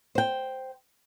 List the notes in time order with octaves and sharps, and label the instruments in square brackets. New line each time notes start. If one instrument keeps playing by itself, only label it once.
[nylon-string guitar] C5 G5